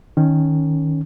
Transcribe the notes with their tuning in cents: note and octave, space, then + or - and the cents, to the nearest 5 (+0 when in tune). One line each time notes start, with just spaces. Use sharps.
D#3 +0 C#4 +0